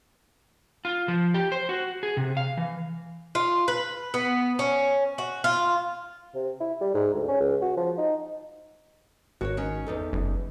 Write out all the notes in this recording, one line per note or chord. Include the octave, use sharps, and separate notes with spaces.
F4
F3
G4
C5
F#4
G#4
C3
F5
E3
F4
B4
B3
C#4
F#4
F4
C3
E4
G3
G#2
D2
C#4
C#2
F#4
F3
D#4
G#1 F#4 A#4 C#5
D#3 C#4
E2 D#4 A4
F#1